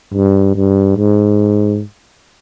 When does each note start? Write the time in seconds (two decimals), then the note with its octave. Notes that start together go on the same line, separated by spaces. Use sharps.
0.14 G2
0.55 G2
0.97 G#2